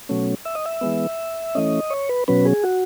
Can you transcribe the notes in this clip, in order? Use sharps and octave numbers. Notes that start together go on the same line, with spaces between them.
B2 F#3 A3 C#4
E5
D#5
E5
E3 G#3 B3
E3 A3 C#4 D#5
C#5
B4
B2 F#3 C#4 B4
G#4
F#4